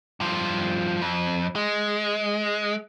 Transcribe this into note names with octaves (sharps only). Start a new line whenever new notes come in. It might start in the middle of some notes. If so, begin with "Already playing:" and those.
G2 F3
F2
G#3